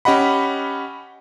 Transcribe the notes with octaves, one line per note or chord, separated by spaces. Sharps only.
C#4 G4 D#5 F#5 B5